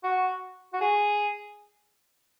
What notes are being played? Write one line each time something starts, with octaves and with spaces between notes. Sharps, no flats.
F#4
F#4
G#4